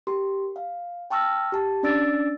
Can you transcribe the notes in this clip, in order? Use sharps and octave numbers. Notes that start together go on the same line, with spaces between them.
G4 A#4 C6
F5
G5 A5 C#6 E6 F6 A#6
G4 A5
C#4 D4 D5 E6 A6 D7